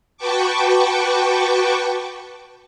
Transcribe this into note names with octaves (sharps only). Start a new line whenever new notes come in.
F#4 B4 G5 A5 C#6 D6